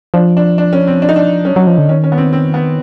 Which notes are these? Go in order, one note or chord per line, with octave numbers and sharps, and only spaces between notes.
F3 D4
D4
D4
C#4
C4
D4
D#4
D4
F#3 C#4
F#3
F3
D3
D#3 C#4
C#4
B3
C4
C4
B3